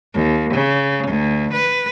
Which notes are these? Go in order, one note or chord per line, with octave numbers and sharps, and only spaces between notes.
D#2
C#3
D2
B4